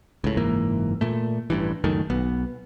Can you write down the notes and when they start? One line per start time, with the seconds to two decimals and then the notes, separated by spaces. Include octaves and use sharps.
0.24 C#2 A2
0.37 F#1 G#2 E3 A#3
1.01 A#2 A3
1.50 A1 G2 E3
1.84 C#2 F#2 D#3 A3
2.10 B1 B3